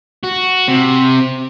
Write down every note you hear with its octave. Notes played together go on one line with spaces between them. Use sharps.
F#4
C3